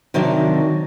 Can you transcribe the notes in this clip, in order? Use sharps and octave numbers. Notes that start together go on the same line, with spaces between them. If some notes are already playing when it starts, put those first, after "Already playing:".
C3 D#3 F#3 D4